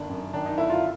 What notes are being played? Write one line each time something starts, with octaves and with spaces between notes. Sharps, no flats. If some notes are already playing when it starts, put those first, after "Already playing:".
Already playing: G1 D#3 D4
F#2
D#3 D4
D#4
G1 E4
F4